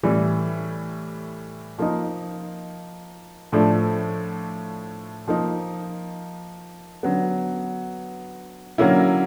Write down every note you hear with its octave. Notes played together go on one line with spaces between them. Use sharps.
A2 E3 G3
F3 A#3 D#4
A2 F3 A3 D4
F3 A#3 D#4
D3 F#3 B3
D3 F#3 A#3 C#4 E4